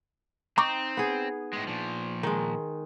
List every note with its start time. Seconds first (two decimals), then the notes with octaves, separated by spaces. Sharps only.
0.58 C4 D#4 A#5 C#6 D6
0.97 B3 G#4
1.53 A2 G#3
1.67 A#2 F3
2.23 D#3 G#3